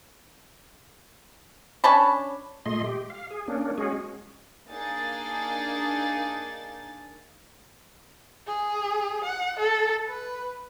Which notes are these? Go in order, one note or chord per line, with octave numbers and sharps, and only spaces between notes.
C#4 D4 A5 B5
A#2 G#3 A3 D#5 C6
G4
F5
G#4
A#3 C#4 D4
G#3 C#4 F#4 G#4
A#3 D4 D#4 G#4 F5 A6
G#4
F#5
A4
B4